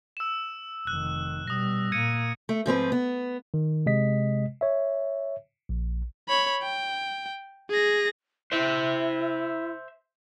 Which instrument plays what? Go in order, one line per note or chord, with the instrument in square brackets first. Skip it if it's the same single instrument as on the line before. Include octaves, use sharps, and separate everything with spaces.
[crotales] E6 E7
[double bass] F1 D#3 [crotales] F#6
[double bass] B2 G3 [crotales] D#6 A#6
[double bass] A#2 A#3 [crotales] G#6 C#7 D#7
[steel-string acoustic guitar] A3
G#2 F3 C4 B4
B3
[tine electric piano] D#3
C3 G#3 D#5 B6
C#5 E5
A#1
[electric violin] C#5 B5
G5
G#4 A#6
[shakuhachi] E4 [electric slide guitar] C5 E5